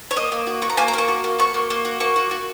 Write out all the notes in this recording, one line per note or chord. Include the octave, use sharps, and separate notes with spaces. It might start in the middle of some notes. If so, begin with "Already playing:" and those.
C#5
A#3 D#5
A#3
F#4
F#4 C#6
A#5
A#3 G#5
A#5
A#3 C#6
F#4
A#3
F#4 C#6
A#3
A#3
F#4
A#3 C#6
F#4
F#4